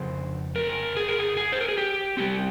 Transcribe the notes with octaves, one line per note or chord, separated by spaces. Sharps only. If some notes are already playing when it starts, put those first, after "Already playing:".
Already playing: F2 C#3 C5
A#4
G#4
A#4
G#4
G#4
C5
A#4
G#4
G4
C3 G3 C4 G4